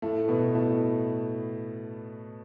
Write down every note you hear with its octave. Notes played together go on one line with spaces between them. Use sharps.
A2 A3
B2 B3
A2 A3